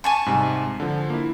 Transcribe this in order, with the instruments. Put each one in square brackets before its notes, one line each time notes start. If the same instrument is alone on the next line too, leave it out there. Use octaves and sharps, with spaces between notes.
[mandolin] G#5 A5 C#6
[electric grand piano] G#2 C3 G3
D3 F3
A#3 E4